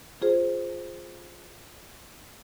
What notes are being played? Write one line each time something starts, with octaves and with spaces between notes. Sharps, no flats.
F4 G#4 C5